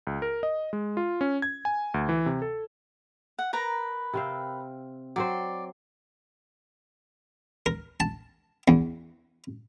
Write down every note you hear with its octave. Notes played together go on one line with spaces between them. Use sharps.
C#2
A#4
D#5
G#3
F4
C#4
G#6
G#5
D2
E3
C3
A4
F#5
A#4 B4 A#5
C3 C4 F5
F#3 C4 C5 D5
A#4
A5
E2